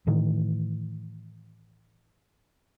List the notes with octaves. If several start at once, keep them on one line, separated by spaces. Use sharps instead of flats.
A2 D#3 E3